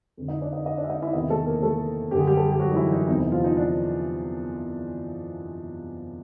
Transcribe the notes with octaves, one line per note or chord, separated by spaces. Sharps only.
F2 D3
D#4 D#5
D4 D5
D#4 D#5
D#4 D#5
D4 D5
E5
D#4 D#5
E4 E5
E2 C3 D#3 D#4 D#5
A3 A4
A#3 A#4
A3 A4
F#2 D3 G4 G#4
G3 G4
A4
G#4
G4
F#3 F#4
D#4
E3 E4
D#4
E2 C3 E3 D#4
D#4
F3 F4
D#4
D4